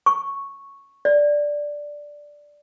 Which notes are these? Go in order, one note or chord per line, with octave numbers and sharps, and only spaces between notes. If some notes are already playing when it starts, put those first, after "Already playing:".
C#6
D5